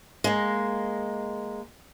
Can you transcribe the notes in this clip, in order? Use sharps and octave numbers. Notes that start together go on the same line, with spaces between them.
G#3 A#3